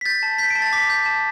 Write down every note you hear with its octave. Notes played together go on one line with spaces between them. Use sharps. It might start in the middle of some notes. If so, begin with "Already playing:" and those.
B6
G6 A6
A5
G6 B6
D7
A5
A6
D6 B6
G6
A5